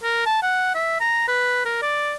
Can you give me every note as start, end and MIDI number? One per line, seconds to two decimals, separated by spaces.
0.03 0.22 70
0.26 0.38 81
0.43 0.74 78
0.75 0.99 76
1.01 1.26 82
1.28 1.64 71
1.65 1.78 70
1.82 2.15 74